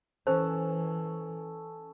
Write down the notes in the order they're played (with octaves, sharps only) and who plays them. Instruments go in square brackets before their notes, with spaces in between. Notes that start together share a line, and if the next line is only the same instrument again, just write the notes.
[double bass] E3 [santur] C#4 A4 [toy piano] C5